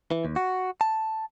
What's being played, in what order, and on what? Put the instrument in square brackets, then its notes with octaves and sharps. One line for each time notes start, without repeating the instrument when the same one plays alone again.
[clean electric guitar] E3
D#2
F#4
A5